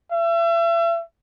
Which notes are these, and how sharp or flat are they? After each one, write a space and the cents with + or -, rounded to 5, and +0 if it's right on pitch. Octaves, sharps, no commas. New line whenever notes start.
E5 +35